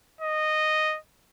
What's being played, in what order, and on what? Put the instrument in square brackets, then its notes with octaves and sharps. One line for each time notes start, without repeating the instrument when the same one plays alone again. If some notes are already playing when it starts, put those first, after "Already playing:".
[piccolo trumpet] D#5